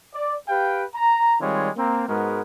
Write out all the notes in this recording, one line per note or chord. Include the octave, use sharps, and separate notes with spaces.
D5
G4 B4 F5 G5
A#5
D#3 G3 G#3 C4 F4 C#5
A#3 C4 A#5
G#2 G#3 B3 F#4 A#4